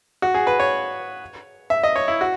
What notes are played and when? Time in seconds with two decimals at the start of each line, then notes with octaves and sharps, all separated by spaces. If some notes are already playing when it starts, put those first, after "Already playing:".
0.22 F#4
0.34 G#4
0.47 B4
0.60 C#5
1.70 E5
1.83 D#5
1.96 C#5
2.08 E4
2.21 F#4